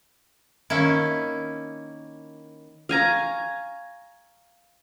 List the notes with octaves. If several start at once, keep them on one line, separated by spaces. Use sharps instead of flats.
D#3 A#3 C#4 E4
F5 G#5 A#5 C#6